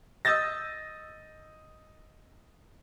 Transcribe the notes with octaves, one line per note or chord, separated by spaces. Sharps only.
D#5 D#6 E6 G6 A6 A#6